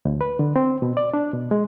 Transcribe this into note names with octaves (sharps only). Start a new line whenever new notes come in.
D2
B4
D3
C4
B2
D5
D4
B2
G#3